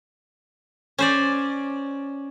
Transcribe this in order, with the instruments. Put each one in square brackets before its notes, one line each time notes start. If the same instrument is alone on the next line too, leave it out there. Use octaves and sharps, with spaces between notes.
[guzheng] C#4 C5 D5